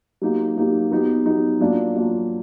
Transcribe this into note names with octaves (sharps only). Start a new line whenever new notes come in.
F#3 A#3 D#4 G4
F#3 A#3 D#4 G4
F#3 B3 D#4 G4
F#3 B3 D#4 G4
F#3 A#3 D4 F4
F#3 A#3 D4 F4